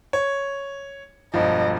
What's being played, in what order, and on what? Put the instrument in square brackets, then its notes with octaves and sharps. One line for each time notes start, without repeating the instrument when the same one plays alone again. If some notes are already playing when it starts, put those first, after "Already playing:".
[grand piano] C#5
[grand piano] E1 G2 F3 [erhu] D#5